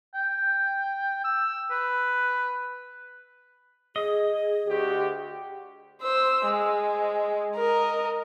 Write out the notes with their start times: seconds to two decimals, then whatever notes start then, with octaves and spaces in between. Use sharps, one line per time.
0.14 G5
1.24 E6
1.71 B4
3.96 G#4 D#5
4.67 D2 F#4 G4
6.02 C5 E6
6.45 G#3
7.56 A#4 D#5